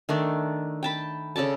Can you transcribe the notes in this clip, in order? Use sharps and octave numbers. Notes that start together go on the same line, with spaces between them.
D#3 A3 D4
G5 A5 B5
C#3 A4 D5 A5